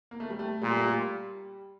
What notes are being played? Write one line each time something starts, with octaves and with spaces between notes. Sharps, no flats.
A#3
A3
G3
A3
A#2 G3
A3
G3